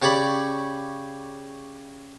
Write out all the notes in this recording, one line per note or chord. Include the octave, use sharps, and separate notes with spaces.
C#3 G4 C#5 D5 B5